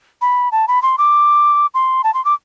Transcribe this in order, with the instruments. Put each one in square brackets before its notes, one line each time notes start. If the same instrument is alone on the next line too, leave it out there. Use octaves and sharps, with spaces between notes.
[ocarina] B5
A5
B5
C6
D6
C6
A5
C6
D6